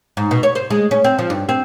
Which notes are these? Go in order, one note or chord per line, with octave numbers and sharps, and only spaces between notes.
G#2
B2
C#5
C5
G#3
C#4
C4
F3
G2
C4